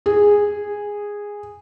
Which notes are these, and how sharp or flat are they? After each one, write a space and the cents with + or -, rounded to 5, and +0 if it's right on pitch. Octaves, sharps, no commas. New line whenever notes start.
G#4 -10